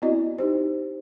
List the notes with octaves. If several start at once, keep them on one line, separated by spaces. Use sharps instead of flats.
B3 C4 E4 F#4 D5 D#5
D#4 G4 C5